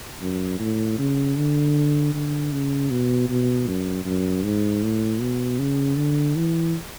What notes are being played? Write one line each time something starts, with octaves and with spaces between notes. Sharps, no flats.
F#2
A2
C#3
D3
D3
C#3
B2
B2
F#2
F#2
G#2
A2
B2
C#3
D3
E3